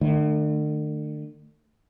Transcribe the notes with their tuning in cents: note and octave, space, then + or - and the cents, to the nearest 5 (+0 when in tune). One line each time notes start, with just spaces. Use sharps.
D3 +40 A3 +0